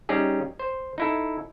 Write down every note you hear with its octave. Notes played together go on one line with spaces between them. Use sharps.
G3 C#4 D#4 G4 G#4
C5
D#4 E4 A4